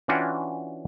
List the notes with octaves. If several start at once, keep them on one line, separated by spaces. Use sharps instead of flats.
E3 C#4 D4 F4 F#4 G5